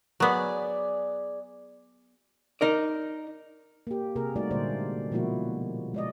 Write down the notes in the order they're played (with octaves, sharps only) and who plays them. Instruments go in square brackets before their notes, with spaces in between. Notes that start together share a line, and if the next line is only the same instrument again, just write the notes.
[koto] F#3 B3 [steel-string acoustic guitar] G#4 D5
[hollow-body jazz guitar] D#4 A#4 D5
[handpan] A#3 G4
C3 A#3 G#4 A#4
G3 A3 D#4 F#4 D5
A#2 D3 G#3 C5 D5
B2 F3 G#3 A#3 E4 F#4
G#3 D5 D#5